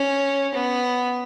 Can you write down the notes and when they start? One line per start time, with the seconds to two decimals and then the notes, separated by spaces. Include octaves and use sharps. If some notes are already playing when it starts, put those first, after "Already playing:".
Already playing: C#4
0.55 B3